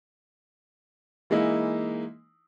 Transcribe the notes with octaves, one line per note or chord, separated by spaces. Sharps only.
E3 G#3 A#3 D#4 E4